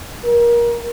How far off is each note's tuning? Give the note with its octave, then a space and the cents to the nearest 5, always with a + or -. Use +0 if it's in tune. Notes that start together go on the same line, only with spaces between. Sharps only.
A#4 +25